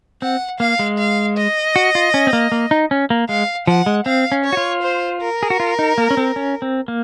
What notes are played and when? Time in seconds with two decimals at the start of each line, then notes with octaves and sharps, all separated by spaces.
0.22 C4 F#5
0.60 A#3 F5
0.79 G#3
0.98 F5
1.37 D#5
1.76 F#4
1.95 F4
2.14 C#4
2.27 C4
2.33 A#3
2.52 A#3
2.71 D#4
2.91 C#4
3.10 A#3
3.29 G#3 F5
3.67 F3 F#5
3.86 G#3
4.06 C4 F5
4.32 C#4
4.45 C#5
4.53 F#4
4.57 F4
4.82 C5
5.21 A#4
5.43 G#4
5.50 F#4
5.60 F4
5.79 D#4
5.98 A#3
6.10 C#4
6.17 C4
6.36 C#4
6.62 C4
6.88 A#3